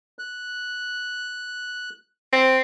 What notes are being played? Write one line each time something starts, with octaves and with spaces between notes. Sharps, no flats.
F#6
C4